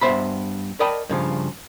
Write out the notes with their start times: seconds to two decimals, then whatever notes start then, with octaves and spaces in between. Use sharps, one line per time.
0.01 G2 B3 C5 E5 B5
0.80 A#4 D5 D#5 G5 A5 B5
1.09 G2 C#3 F3